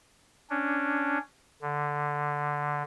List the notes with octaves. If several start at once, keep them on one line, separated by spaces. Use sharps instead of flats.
C#4 D4
D3